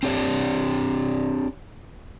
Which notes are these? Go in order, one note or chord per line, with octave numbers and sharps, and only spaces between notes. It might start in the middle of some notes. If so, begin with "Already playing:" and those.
C4 D4 G4 G#4 C#5 D5